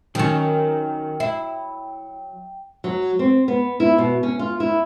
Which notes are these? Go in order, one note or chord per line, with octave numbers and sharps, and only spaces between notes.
D#3 F#3 C#4 G5
E4
F#3
C4
B3
E4
B2
C#4
F4
E4